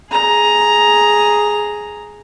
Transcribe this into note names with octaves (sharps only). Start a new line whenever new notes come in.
G#4 A#5